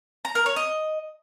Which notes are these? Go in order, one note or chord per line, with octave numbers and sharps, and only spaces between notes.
A#5
A#4
C#5
D#5